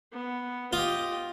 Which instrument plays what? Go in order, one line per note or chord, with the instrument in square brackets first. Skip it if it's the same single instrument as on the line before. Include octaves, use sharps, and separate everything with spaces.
[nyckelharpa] B3
[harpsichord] F4 [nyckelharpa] G4 D#5